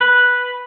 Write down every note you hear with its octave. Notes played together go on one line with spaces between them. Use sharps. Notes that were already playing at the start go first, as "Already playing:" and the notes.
B4